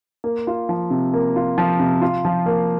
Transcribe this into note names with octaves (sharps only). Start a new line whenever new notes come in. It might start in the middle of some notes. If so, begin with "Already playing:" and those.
A#3
F4
F3
C3
A#3
F4
F3
C3
F4
F3
A#3